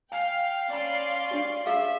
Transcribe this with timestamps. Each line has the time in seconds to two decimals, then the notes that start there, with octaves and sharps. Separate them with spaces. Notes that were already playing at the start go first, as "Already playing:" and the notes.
0.12 F5 G5 G#5
0.70 C#4 D5 G#5 B5 C6
1.31 D4 G4
1.66 G4 G#4 E5 F5